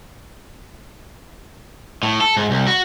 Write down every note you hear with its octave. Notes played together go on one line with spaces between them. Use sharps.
A2
A4
G#2
C2
F#4